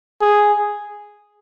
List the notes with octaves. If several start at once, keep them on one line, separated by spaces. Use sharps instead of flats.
G#4